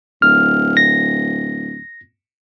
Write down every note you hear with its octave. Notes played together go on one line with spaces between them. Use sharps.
D1 F6
A#6